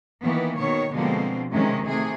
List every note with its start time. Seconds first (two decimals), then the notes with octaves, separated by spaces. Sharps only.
0.23 D#3 E3 A#3 B3
0.58 B2 D#3 C#5
0.93 B2 D3 F3 G#3 A#3 C4
1.51 C3 D#3 G#3 C#4
1.84 C3 A3 G#4